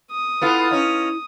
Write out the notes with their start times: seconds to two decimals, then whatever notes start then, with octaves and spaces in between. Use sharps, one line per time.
0.11 D#6
0.42 B3 E4 F4 A4
0.71 C#4 D#4